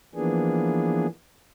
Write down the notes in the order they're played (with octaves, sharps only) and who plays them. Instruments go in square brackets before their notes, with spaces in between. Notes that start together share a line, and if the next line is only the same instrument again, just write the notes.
[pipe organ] E3 F3 A#3 B3 D4 G#4